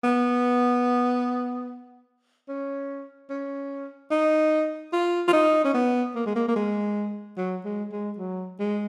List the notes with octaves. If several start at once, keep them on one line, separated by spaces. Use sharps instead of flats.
B3
C#4
C#4
D#4
F4
F4
D#4
C#4
B3
A#3
G#3
A#3
A#3
G#3
F#3
G#3
G#3
F#3
G#3